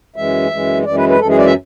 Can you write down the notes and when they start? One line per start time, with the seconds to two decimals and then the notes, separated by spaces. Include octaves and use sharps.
0.16 F#2 E3 G#3 E5
0.50 F#2 E3 G#3
0.85 F#2 E3 G#3 D5
0.97 B4
1.09 B4
1.20 F#2 E3 G#3 A4
1.29 G#4
1.38 D5
1.46 E5